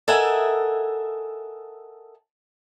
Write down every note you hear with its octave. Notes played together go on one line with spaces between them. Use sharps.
A4 A#4 D#5 E5 F#5 G#5